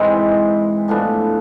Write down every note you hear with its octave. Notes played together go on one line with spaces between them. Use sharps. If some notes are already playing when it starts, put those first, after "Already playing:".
Already playing: G#2 E3 G#3 C4
A2 F3 B3 D4